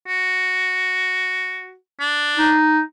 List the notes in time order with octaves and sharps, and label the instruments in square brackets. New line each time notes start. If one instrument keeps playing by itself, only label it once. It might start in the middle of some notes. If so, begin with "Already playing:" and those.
[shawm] F#4
D4
[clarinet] D#4